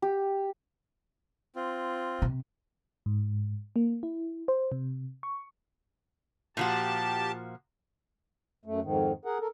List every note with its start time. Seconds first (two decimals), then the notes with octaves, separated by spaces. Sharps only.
0.02 G4
1.56 C4 F4
2.22 C3
3.06 G#2
3.76 A#3
4.03 E4
4.48 C5
4.72 C3
5.23 C#6
6.57 A#2 F3 F#4 G4 A5
8.66 F#2 A3
8.83 F2 G#2 D#3
9.25 G#4 A#4 F#5
9.40 A4 A#4